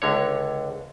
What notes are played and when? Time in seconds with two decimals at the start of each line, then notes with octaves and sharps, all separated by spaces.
0.02 C#2 D3 C#5